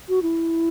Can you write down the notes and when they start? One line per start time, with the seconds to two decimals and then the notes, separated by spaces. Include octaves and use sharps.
0.09 F#4
0.22 E4